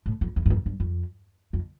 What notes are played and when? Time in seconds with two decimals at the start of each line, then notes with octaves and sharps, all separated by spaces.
0.06 A2
0.21 F2
0.36 E2
0.46 G2
0.50 F2
0.66 G2
0.80 F2
1.53 F2